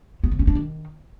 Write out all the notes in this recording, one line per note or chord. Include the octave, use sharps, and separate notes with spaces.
B3
C#3
C#4
D4
D#3